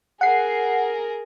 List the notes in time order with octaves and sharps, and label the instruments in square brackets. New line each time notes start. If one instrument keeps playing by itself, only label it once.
[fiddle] G#4 A#4 [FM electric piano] F#5 C7